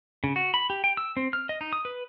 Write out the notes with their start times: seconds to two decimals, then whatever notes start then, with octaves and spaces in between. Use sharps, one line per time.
0.24 C#3
0.36 F#4
0.54 B5
0.70 G4
0.84 G5
0.97 E6
1.17 C4
1.33 F6
1.49 D#5
1.61 D#4
1.73 D#6
1.85 B4